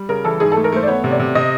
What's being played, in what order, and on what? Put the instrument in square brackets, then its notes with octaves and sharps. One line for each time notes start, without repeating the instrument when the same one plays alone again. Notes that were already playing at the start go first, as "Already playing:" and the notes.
Already playing: [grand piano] G3
[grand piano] C#3 [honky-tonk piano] A#4
[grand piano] E3 [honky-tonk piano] A4
[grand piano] G#2 [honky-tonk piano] G#4
[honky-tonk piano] A4
[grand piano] A3
[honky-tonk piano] A#4
[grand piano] A3 [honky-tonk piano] C5
[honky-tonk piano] D5
[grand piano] B3 [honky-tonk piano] C#5
[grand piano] C3
[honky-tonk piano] D5
[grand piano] C3
[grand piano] C3 [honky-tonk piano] D#5